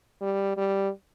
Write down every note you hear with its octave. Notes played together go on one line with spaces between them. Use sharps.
G3
G3